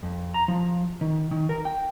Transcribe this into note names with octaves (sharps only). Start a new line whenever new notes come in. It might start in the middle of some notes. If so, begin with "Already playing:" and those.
F2
A#5
F3
D#3
D#3
A#4
G5